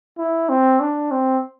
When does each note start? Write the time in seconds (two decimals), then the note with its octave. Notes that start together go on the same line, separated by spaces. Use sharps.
0.18 E4
0.49 C4
0.80 D4
1.11 C4